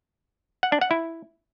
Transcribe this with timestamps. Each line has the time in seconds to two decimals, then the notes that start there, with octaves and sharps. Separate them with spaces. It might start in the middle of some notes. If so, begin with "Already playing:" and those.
0.63 F#5
0.72 D4
0.81 F#5
0.91 E4